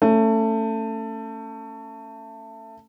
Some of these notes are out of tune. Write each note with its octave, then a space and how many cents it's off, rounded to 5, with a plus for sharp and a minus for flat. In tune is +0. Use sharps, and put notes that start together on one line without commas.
A3 +20 C#4 +0